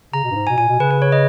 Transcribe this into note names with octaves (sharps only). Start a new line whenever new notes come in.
C#3 A#5
B2
G2
G#2
G#5
B2
A#2 G#5
B2
C#3 B4
B4
C#5
D#5